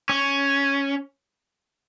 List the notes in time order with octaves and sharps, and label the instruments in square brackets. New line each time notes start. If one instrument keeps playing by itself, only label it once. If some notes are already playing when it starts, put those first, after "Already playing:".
[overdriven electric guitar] C#4